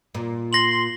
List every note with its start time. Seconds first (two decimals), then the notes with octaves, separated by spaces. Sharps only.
0.14 A#2
0.53 C6 A#6 F#7